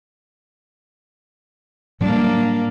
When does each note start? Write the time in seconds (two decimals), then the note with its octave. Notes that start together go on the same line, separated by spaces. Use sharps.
2.01 A2 F#3 G3 A#3 D4